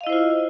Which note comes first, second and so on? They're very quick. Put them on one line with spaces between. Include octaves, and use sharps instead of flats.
F5 D#5 E4 C5 F4